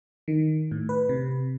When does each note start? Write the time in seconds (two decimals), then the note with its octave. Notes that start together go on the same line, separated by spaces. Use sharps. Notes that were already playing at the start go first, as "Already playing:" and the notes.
0.28 D#3
0.71 A2
0.89 B4
1.09 C3